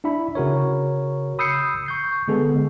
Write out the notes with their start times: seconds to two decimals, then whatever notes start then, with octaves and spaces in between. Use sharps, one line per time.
0.04 D4 E4 E5 B5
0.35 C#3 F#4 A#4 C#5
1.39 B5 D#6 E6 G6 C7 C#7
1.86 C#6 G6 C7
2.28 D3 G#3 B3 G#4 A4